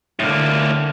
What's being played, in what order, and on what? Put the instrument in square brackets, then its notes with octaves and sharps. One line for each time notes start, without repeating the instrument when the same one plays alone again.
[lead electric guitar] A2 A#3 [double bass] D3